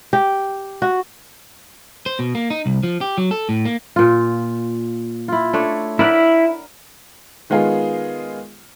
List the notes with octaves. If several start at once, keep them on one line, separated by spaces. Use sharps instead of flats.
G4
F#4
C5
B2
A#3
D#4
C2
F3
G4
F#3
A4
A2
A#3
A#2 F4
E4 F4
A3 D4 C#5
E4 A#4 D5 F#5 B5
D#3 G#3 B3 F4 G#4